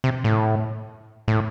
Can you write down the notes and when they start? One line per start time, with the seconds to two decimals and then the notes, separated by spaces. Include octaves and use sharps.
0.04 C3
0.24 A2
1.28 A2